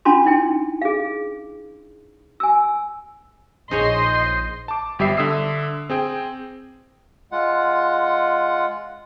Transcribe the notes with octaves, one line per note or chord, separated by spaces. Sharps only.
C#4 D4 F4 A5 C6
D#4 E4 G5
G#4 F5
G#5 E6
A#1 D#4 G#4 C5 C#5 D#5 C6 C7
A5 D6
G1 G3 G4 E5 C7
D3 E5 D#6 E6 C7
C4 G#4 G5
G#3 F4 F#5